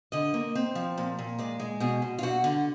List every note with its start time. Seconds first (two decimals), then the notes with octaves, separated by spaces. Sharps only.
0.12 D3 D#5
0.34 A#3
0.55 C4
0.75 F3
0.98 A#2
1.19 A#2
1.39 G#3 D5
1.60 G#3
1.80 B2 G#4
2.02 B2
2.19 F4
2.23 G2 F#4
2.44 D3